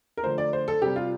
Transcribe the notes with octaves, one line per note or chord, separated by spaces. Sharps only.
A#4
D3 F3 A3 C5
D5
C5
A4
C3 G3 G4
F4